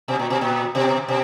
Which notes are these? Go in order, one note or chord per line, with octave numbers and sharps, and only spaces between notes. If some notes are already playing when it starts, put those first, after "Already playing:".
B2
A#2
B2
A#2
B2
B2